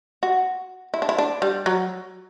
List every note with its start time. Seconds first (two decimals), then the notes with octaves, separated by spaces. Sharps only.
0.23 F#4
0.94 E4
1.02 D4
1.09 E4
1.18 D4
1.42 G3
1.66 F#3